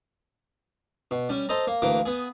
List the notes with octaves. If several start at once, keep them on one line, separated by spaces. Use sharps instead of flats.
B2
G3 C#4
A4 C5 D#5 A#5
A#3
D2 E3 A#3 D6
B3 G#4